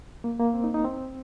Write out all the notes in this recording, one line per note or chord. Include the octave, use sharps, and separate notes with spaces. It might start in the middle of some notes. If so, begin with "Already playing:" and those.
A#3
A#3
C4
D#4
D#4
C4